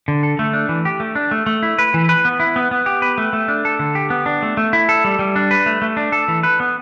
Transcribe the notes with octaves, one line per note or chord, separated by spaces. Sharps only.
D3
A4
A3
D4
E3
G4
A3
D4
A3
A3
E4
B4
E3
B4
B3
E4
B3
B3
G4
B4
A3
A3
D4
A4
D3
G4
B3
D4
A3
A3
E4
A4
G3
G3
D4
B4
A3
A3
D4
A4
E3
B4
B3